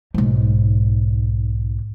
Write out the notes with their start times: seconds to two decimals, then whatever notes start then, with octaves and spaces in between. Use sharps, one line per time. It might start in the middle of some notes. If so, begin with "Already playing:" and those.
0.14 B1 G#2